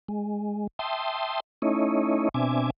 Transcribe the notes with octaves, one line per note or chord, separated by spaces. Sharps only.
G#3
E5 G5 A5 C6 D#6
A3 C#4 D#4 E4 C#5 D#5
B2 C4 D4 E5 G#5 D6